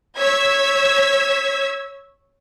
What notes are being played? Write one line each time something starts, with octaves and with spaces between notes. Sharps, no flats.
C#5 E6 G#6 B6